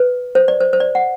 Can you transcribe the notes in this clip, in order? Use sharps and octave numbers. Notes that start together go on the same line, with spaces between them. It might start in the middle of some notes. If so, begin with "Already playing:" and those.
Already playing: B4
C5
D5
C5
C5
D5
F#5